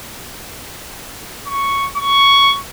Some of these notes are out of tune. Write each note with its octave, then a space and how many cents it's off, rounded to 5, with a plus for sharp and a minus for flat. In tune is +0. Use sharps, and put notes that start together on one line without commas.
C#6 +0
C#6 +5